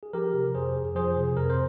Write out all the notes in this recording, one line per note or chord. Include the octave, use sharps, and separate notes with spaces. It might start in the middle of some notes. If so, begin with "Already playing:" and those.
G#4
F3 G4 A#4
C3
F2 G#4 C5
F2
F3 G#4 C5
C3
F2 A#4
C5